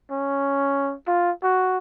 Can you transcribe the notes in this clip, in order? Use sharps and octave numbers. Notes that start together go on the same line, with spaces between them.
C#4
F4
F#4